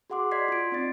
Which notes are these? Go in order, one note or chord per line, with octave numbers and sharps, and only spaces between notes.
F#4 G#4 F#5 C6 D6
D5 D#5 C6 G#6 B6 C7
F4 D7
C4 D#4 D5 A6